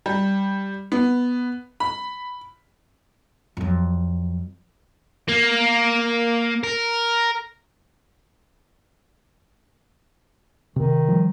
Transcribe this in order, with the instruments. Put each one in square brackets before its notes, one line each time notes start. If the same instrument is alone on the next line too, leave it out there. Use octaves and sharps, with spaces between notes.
[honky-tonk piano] G3
B3
B5
[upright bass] F2 F#3
[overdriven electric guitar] A#3
A#4
[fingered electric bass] C3 [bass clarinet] D#3
[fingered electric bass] F3 G3